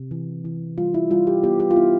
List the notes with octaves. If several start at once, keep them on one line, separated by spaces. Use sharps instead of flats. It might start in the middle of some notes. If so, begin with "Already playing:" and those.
Already playing: C3
E3
E3
G3 F4
E4
G3 F4
G4
B3 G4
G4
F4
B3 E4